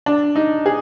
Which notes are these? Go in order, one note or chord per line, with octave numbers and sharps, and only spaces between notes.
D4
D#4
G#4